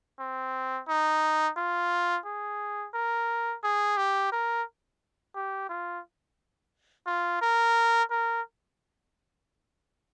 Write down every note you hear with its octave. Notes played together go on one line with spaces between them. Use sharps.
C4
D#4
F4
G#4
A#4
G#4
G4
A#4
G4
F4
F4
A#4
A#4